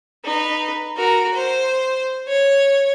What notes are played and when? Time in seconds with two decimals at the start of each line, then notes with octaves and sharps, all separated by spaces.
0.24 D#4 B4
0.97 F#4 A#4
1.34 C5
2.28 C#5